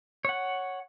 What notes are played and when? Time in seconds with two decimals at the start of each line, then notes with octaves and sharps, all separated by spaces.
0.25 C#5 F#5